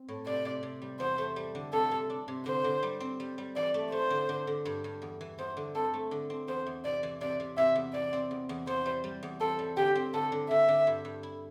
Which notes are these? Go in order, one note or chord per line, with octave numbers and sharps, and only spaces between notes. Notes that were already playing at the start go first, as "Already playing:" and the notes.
Already playing: C4
A2
C3 D5
C3
C3
G3
E2 C5
A3
G3
D3
C3 A4
C3
D4
C3
D3 C5
D3
G3
C4
G3
G3
E3 D5
A3
A3 C5
D3
D3
D3
G2
G2
E2
E3
E2 C5
D3
C4 A4
A3
D3
C4
E2 C5
E2
C3 D5
E3
C3 D5
C3
C3 E5
E2
E3 D5
C4
E2
E2
E2 C5
G3
G3
E2
C4 A4
G3
D3 G4
C4
D3 A4
D3
D3 E5
D3
G2
G2
E4